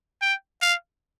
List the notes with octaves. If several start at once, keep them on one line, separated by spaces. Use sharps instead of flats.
G5
F5